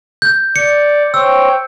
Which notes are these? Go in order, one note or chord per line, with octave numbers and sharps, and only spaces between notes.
G6
D5 C#7
C5 C#5 G5 E6